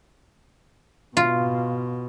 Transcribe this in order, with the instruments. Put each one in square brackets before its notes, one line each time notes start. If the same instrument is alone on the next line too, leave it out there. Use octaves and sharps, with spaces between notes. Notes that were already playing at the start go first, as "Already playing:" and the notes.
[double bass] B2 [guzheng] F4